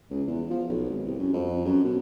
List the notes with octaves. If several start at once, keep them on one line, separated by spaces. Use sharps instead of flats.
C#2
E2
F3
B1
G#1
C2
F#2
F2
F#2
B2